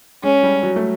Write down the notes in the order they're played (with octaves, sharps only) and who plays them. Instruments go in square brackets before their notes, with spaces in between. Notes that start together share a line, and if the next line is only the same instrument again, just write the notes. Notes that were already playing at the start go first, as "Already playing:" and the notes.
[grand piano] G#3 [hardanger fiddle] C#4
[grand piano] G3
F#3
A3